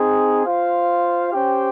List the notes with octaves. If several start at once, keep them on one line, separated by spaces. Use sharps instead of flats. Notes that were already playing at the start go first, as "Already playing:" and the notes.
Already playing: C4 D#4 G#4
F4 C5 F5
C#4 G4 C5 G5